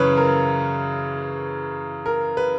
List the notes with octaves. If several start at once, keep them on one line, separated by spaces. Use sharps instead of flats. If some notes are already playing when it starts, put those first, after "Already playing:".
Already playing: F#2 C#3 E3 B4 C#5
A#4
A#4
B4